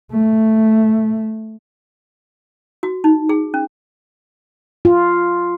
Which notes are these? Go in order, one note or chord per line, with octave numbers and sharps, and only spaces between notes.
A3
F#4
D#4
G#4
C#4
F4